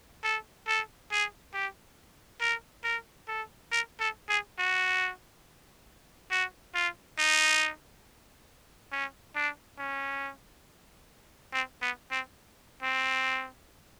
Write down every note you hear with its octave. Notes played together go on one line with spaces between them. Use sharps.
A4
A4
G#4
G4
A#4
A#4
A4
A#4
A4
G#4
F#4
F#4
F4
D#4
C#4
D4
C#4
C4
B3
C4
C4